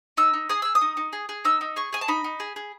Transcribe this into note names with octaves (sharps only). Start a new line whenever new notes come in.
D#4 E6
D#4
G#4 D#6
G#4 E6
D#6
D#4
D#4
G#4
G#4
D#4 E6
D#4
G#4 C#6
G#4 G#5
A5
D#4 B5
D#4
G#4
G#4